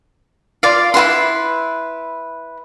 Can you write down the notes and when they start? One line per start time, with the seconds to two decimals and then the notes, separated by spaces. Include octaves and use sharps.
0.63 F4 D5 F5
0.94 E4 F#4 B4 C6